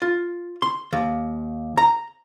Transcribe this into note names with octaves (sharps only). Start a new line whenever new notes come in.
F4
C6
D#2
A#5